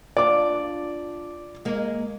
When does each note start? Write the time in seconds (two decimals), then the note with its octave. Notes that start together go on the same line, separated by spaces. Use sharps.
0.17 D4 F4 D5 D6
1.65 G#3 A#3